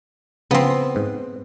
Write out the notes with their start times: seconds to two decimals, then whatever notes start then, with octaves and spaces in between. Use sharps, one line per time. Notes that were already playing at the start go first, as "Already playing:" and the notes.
0.51 C#3 F3 B3 C4 G#4
0.96 G#2